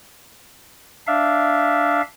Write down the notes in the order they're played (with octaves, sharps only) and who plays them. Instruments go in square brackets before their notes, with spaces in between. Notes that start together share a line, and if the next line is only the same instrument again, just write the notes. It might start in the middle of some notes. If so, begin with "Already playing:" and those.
[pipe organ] D4 E5 F5